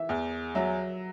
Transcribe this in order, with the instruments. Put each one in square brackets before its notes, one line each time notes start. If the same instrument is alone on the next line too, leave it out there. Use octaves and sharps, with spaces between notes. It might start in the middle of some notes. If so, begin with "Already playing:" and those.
Already playing: [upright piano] E3 [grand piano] E5
[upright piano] E2
[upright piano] F#3 [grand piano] E5